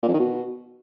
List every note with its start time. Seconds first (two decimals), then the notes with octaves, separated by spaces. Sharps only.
0.02 A#2
0.08 F2
0.14 D#3
0.19 B2